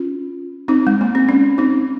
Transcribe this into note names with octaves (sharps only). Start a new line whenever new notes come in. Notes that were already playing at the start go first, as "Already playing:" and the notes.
Already playing: C#4 F4
C4 D#4
G#3
A#3
C4
C#4
C4 D#4